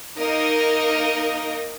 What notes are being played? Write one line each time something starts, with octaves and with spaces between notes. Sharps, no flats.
A#3 D#4 A#4 D#5